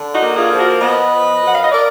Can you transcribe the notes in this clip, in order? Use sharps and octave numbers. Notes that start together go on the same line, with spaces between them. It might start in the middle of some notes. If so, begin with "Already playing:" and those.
Already playing: D3
D#4 F#4
A#3
F4 G#4
F3
F#4 A#4
B3 B4 D#5
F3
F#2
F#5
F5
D#5
A#4 D5